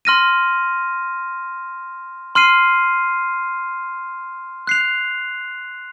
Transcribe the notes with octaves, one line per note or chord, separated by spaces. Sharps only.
C6 F6 A#6 D#7
C6 F6 C7 D#7
F#6 C7 F7